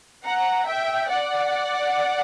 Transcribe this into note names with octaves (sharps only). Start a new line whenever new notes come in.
F#5 A#5
E5 G5
D5 F#5